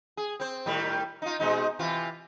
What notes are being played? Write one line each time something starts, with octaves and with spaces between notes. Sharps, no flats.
G#4
C4 C5
A2 D#3 G3
D#4 F4
B2 G#3 D#4
C3 E3 F4